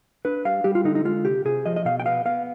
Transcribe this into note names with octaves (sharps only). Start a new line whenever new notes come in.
D4 B4
G3 F5
G3 G4
F4
D3 D#4
D#4
G#3 F4
C3 G4
C3 G#4
F3 D#5
D#5
B2 F5
G5
B3 F5
B3 F5